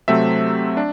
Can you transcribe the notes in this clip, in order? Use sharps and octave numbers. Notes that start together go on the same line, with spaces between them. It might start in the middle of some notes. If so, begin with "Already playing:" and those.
C3 F#3 A3 C4 E5
D4